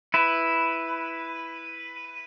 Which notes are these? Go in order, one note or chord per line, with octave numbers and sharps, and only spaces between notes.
E4 B4